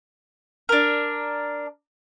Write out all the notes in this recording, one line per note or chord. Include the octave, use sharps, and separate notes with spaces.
D4 A#4